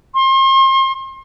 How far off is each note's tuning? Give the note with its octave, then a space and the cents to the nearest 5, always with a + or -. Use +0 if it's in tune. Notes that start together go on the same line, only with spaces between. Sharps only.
C6 +40